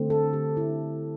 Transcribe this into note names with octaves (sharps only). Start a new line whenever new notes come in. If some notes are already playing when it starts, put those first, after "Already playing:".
Already playing: D3 A3 C4
A4
G4
E4